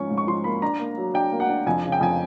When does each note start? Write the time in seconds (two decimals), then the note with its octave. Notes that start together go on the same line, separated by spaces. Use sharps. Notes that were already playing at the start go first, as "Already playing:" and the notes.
Already playing: G#2 F3 C#4 C#6
0.10 G#2
0.17 C#6
0.27 F3 C6
0.44 A#3 B5
0.62 D4 A#5
0.80 A#3
0.98 F#3
1.14 D4 G5
1.32 A#3
1.40 F#5
1.49 D4
1.67 F2 G#5
1.84 C#3
1.92 G5
2.01 F2 G#5